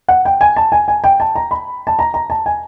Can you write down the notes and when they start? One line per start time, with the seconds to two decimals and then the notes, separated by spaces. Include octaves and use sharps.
0.08 F#5
0.25 G5
0.41 G#5
0.56 A5
0.72 G#5
0.88 G#5
1.04 G5
1.20 A5
1.35 A#5
1.51 B5
1.87 A5
1.99 A#5
2.14 A#5
2.30 A5
2.46 G#5